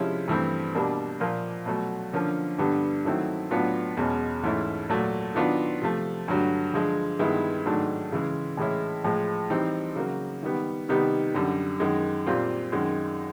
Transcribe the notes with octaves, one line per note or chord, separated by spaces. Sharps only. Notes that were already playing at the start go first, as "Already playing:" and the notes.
Already playing: C3 F3 G#3 C#4 E4
G2 E3 A3 C4
B2 G3 A#3 D4
A#2 F3 A#3
B2 F#3 A3
D3 F3 A#3 C#4
G2 D3 G3 B3 D4
D#3 F#3 A3 C4 E4
A2 F#3 B3 D4 F4
E2 B2 G#3 C#4
G#2 E3 A3 C#4 E4
A#2 F#3 A3
D#3 F#3 B3 D4 F4
C3 F3 A3
G2 D3 F#3 A3
D3 F3 G#3
G2 D#3 G#3 B3 E4
G#2 D#3 F#3 A3 D4
C#3 E3 G#3
A2 E3 G#3 C#4 E4
A2 F3 G#3
E3 G3 C4 D#4
C#3 F#3 A#3
D#3 G3 B3
C3 D#3 G3 B3 D#4
F#2 D3 G3
F#2 D#3 G#3
A#2 G3 C4 F4
F#2 D#3 G#3